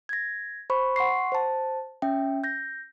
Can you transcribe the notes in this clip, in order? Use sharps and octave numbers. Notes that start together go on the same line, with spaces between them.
G#6 A#6
C5 B5 C#6
F#5 C6 C#6 C7
C5 A5
C#4 E5 G5
G6 A#6